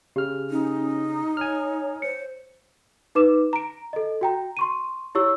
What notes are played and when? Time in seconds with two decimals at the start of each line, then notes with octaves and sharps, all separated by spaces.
0.16 C#3 G4 F6
0.50 C#4 D#4
1.37 C#5 G#5 F6
2.02 C5 C#7
3.15 D#4 B4 D6 E7
3.53 A#5 D7
3.93 A4 D#5
4.21 F#4 G5 A#5
4.57 C6 C#6 D#7
5.15 E4 G4 C#5 C#6 E6